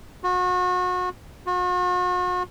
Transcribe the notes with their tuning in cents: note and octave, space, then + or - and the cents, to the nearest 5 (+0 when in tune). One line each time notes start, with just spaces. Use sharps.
F#4 -35
F#4 -45